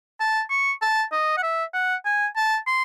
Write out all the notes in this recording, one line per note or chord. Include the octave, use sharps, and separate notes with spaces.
A5
C#6
A5
D#5
F#5
E5
F#5
G#5
A5
C6